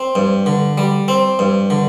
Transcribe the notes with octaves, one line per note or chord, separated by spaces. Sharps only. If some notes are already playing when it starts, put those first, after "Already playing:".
Already playing: C4
G2
D3
G3
C4
G2
D3